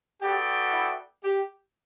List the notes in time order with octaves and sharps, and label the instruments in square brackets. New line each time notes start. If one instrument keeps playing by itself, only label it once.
[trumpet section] B3 F#4 A4 D5 G5 [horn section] G4
[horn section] E4
G4